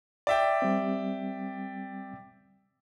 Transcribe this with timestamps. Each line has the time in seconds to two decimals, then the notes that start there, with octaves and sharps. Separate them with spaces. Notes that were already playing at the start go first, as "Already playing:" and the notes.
0.27 D5 E5 G5
0.62 G3 C4